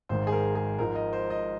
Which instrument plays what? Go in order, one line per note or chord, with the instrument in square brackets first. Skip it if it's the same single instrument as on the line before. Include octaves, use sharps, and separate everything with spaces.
[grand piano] G#1 G#2 D#3 C5
G#4
A#4
G#4
G#1 G#2 F3 A#4
D#5
C5
D#5